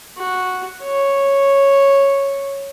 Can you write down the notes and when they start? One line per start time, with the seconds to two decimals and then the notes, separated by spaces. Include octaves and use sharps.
0.18 F#4
0.84 C#5